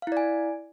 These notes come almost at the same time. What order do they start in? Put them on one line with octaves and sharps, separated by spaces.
F5 E4 D5 G#5